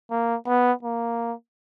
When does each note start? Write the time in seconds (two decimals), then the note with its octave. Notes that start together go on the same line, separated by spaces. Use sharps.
0.11 A#3
0.47 B3
0.83 A#3